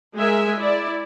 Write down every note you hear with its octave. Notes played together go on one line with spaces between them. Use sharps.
G#3 A#4 E5 G#5
E4 D5